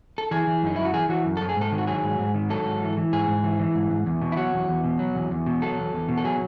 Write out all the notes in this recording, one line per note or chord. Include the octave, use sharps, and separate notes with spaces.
A4
E3 G#4
E3
F#2 D#4
F#2 E4
F#4
E3 G#4
E3 F#4
F#2
F#2 A4
G#4
G#2 A4
D#3
F#4
F#3 G#4
G#2
G#2
D#3
F#3 A4
G#2
E3
E3
G#2 G#4
G#2
E3
E3
G#2
G#2
E2
B2
E4
F#3 F#4
E2
E2
B2
F#3
E2
E2
B2
F#3 A4
E2
E2
B2
A4
F#3 G#4